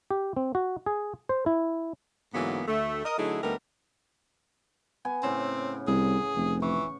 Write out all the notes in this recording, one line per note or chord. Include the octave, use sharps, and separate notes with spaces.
G4
C4
F#4
G#4
C5
E4
G#2 D3 E3 F#3 A#3 B3
D2 A3
A#4 D#5
D3 F#3 A3 D#4 E4 G#4
D2 G3 A3 B3 D#4 A#4
B3 G#5
A2 C#3 C4
C2 G#4
F1
E3 C#6